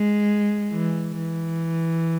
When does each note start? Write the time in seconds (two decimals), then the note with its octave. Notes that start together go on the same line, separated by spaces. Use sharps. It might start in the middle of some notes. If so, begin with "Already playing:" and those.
Already playing: G#3
0.71 E3
1.18 E3